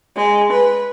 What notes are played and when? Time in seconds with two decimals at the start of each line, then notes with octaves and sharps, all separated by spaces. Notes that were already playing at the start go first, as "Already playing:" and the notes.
0.16 G#3
0.52 B4